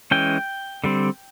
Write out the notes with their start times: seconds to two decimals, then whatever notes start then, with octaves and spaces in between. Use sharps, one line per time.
0.11 E3 G#3 C#4 G5
0.84 D3 G3 C4